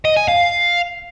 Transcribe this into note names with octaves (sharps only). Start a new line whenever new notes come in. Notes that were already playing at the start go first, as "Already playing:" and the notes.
D#5
G#5
F5